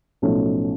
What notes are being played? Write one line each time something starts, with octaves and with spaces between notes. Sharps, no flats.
B1 A2 F3 A3 C#4